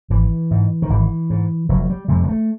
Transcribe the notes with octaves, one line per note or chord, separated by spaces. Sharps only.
G#1 E3
G#2
D#3
G#1 E3
G#2
F1 F#3
G3
F2 C3 G#3
G#3
A3